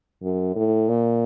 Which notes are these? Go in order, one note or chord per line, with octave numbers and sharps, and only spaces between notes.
F#2
A2
A#2